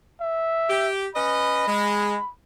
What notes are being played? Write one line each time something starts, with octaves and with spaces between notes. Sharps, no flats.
E5
G4
C#4 B4 D#5 B5
G#3